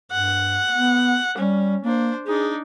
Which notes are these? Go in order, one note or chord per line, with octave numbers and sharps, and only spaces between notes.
G2 F#5
B3
G3 C#4
A#3 D4 C5
D4 D#4 G#4